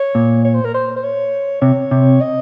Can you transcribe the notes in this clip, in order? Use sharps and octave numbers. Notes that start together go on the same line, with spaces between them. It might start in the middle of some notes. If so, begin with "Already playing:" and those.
Already playing: C#5
A#2
C#5
C5
A#4
C5
C5
C#5
C3 C#5
C3
D#5